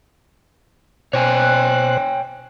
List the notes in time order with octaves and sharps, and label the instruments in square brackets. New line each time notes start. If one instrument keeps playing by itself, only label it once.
[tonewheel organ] B2 C5 F#6 [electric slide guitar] C#5 G5 G#5